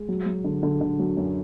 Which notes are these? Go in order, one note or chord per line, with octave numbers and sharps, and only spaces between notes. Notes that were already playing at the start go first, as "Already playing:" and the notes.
Already playing: G#3
F#3
F#3
D3
D3
D3
F#3
F#2